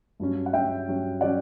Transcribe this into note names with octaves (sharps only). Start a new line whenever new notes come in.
G2 F#3 C#4
F#5
G2 F#3 C#4 E5 G5
G2 F#3 C#4
F#3 C#4 D5 F#5